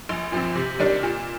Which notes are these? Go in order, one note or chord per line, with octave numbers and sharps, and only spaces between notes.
A#1
A#2 F3 C4
C3
D#3 G3 D4
A#2